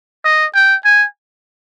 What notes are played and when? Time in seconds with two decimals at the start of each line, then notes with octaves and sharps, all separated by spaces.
0.24 D#5
0.54 G5
0.84 G#5